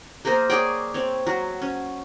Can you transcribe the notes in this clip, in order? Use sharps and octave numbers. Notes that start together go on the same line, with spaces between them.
A#3 G#4 A#4 C5
G#4 C#5 D5 G5
C4 C#5
F#3
C#4